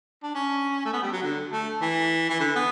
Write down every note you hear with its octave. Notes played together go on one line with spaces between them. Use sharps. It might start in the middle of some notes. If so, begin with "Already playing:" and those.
D4
C#4
A3
B3
G3
F#3
D3
A3
E3
E3
D3
B3